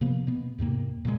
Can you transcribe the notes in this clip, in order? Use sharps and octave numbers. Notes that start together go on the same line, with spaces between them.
C3 F3 A#3 B3
B2 B3
E2 G#2 C3 A#3
A#2 C#3 G3 G#3